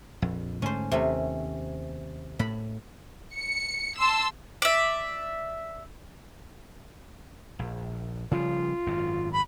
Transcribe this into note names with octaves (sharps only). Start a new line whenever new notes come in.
A#1 F2
G#2 D3 A3 C#4 C5
D#2 C3 A3 C#4
A2 B5
C#7
A5 C6 E6
D5 E5
A#1
C#3 F3 G3 F4
G#1 F#2
B5